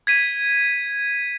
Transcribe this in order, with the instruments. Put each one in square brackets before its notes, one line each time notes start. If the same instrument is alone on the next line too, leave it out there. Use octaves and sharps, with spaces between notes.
[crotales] G#6 B6 D#7